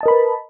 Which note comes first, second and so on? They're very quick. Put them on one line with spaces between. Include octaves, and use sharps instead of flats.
A5 D#5 A#4 B5 B4